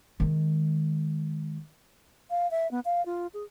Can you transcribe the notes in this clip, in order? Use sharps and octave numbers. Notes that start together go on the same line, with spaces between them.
D#3 G#3
F5
E5
B3
F5
F4
G#4